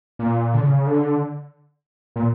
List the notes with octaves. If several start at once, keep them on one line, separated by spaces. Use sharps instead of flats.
A#2
D3
C#3
D3
A#2